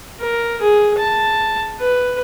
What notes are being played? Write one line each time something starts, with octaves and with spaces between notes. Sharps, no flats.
A#4
G#4
A5
B4